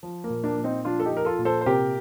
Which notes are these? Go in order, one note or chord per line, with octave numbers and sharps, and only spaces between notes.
F3
A#3
A#2
A#3 D4
A#2
C4 D#4
F3 D4 F4
A4
D#4 G4
F3 A#4
F4 A4
A#2
A4 C5
C5
C3 G4 A#4